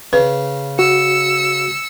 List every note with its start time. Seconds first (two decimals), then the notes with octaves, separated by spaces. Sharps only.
0.13 C#3 B4
0.79 F#4 E6 C#7